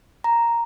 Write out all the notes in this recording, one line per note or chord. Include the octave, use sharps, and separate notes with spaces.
A#5